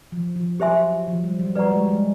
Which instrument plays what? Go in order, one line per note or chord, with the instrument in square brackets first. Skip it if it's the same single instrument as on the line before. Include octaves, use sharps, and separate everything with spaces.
[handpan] F3
F3
[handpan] F#3 [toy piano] G4 C5 E5 G#5 C6
[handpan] F3
G3
F#3
[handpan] G3 [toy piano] B4 D5 F#5 A#5 C#6
[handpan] G#3
G#3